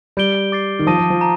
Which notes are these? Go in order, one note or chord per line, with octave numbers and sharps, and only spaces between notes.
G3 G6 D7 G7
D6 A6 C7
D#3
F3 A5 D#6 A#6 D#7
F3
F3
A#5